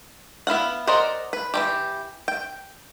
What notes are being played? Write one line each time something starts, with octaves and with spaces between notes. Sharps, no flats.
B3 E4 F5 F#5
A#4 C5 D5 D#5 F#5
B4
E3 A3 G4
G5